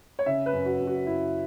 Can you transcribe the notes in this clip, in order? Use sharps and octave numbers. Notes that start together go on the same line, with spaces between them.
C#5
C#3 E5
B4
F#2
F#4
F#2
F#4
F#2 E4